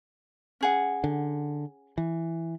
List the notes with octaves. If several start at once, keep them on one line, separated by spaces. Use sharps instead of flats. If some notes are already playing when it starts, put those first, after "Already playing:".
C#4 G#4 F#5
D3
E3